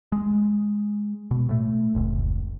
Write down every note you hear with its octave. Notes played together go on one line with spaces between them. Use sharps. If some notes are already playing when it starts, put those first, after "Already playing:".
G#3
B2
A2 A3
F1 C#2